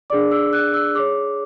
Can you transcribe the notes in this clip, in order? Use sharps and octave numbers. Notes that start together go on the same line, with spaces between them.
D4 G#4 D5 D6
E6
F#6
E6
G#4 C#5 D6